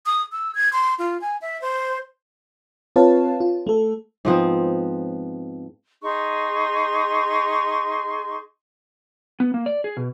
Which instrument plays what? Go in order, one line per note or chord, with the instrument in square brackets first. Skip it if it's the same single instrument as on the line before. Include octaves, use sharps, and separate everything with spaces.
[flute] D#6
E6
G#6
C6
F4
G#5
E5
C5
[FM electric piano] C4 F4 B4 C#5 F5 A5
F4
A3 A4
[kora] G#2 F3 B3 C4
[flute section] D#4 G#4 C6 C#6
[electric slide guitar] B3
A#3
D5
G#4
B2